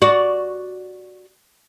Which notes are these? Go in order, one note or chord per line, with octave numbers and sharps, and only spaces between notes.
F#4 D5